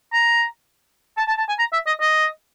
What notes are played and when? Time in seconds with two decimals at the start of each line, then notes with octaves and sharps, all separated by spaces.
0.13 A#5
1.17 A5
1.28 A5
1.38 A5
1.48 G#5
1.59 A#5
1.73 E5
1.87 D#5
2.01 D#5